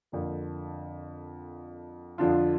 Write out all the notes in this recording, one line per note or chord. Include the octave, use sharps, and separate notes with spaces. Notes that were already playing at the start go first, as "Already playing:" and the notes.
F2 D3 A#3
F2 D3 F3 D4 F4